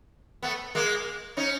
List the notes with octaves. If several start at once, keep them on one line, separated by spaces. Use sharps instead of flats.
A3 B3
G#3 A#3
C#4 D#4